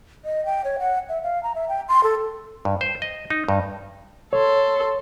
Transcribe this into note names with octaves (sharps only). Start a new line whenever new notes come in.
D#5
G5
C#5
F#5
E5
F5
A#5
E5
G5
C6
A4
G2
C5
D#5
D#4
G2
A4 C#5 C6